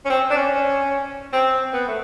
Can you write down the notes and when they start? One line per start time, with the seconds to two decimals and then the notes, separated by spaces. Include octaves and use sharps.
0.05 C#4
0.10 C4
0.31 D4
0.37 C#4
1.33 C4
1.73 B3
1.88 A3